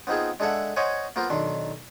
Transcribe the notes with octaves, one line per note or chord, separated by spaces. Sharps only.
B3 C4 D#4 F4 G#4
G#3 D4 G#4 A4 E5 F#5
C5 C#5 D#5 F#5 G#5
A#3 B3 F4 A#4 C5
B1 D#3 D4 C6